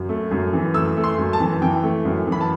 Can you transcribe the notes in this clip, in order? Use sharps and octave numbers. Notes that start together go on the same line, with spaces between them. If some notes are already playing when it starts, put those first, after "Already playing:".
Already playing: F#2
A3
F#2
E3
A3 E6
A3
C6
F#2
A5
E3
E3 G5
A3
F#2
E3
B5
A5